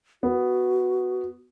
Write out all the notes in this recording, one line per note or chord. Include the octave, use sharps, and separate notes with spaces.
B3 F#4